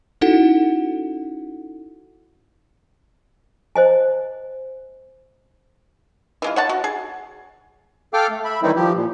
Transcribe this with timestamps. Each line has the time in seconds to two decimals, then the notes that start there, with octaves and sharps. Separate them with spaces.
0.21 C#4 D#4 E4 F#4 A4 F#5
3.75 C5 D#5 G#5
6.42 E3 G#3 F4
6.56 C#5 F#5 A5
6.69 F#4
6.84 G#4
8.14 A4 F5 G5 D6 F6
8.30 A3
8.45 E5 B5
8.63 D#3 E3 G3 C4 D#4 E4
8.76 F3 G4
8.95 A#2